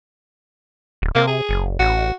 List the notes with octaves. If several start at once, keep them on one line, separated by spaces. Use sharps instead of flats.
D1
C3 A#3
G#4
F#1
A1 F#4